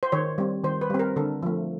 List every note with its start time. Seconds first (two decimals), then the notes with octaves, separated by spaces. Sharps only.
0.03 C5
0.12 D#3 C#5
0.38 G3 C4
0.64 D#3 C5
0.81 B4
0.90 G3 C4
0.99 A#4
1.16 D3 A4
1.43 F3 A3